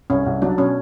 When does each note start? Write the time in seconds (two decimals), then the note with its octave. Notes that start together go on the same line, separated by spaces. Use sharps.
0.10 C2 C#4
0.26 C2
0.42 F#3 D4
0.58 B2 C#4